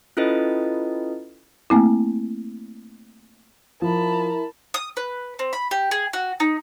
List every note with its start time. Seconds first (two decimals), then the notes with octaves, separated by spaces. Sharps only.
0.17 C#4 E4 F4 A4 B4 D#5
1.70 A3 A#3 C4 E4
3.82 F3 E4 A#4 A5 B5
4.74 D#6
4.97 B4
5.39 C4
5.53 B5
5.71 G4
5.91 G#4
6.13 F#4
6.40 D#4